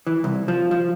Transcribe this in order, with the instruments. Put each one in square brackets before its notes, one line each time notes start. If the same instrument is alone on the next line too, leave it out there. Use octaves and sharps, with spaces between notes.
[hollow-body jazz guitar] E3
C2
F3
F3